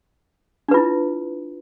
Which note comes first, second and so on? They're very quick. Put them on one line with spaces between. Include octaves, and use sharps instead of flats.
D4 B4 F4 E4